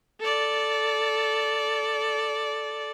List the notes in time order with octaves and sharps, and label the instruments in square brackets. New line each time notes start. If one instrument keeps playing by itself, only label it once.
[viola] A4 D5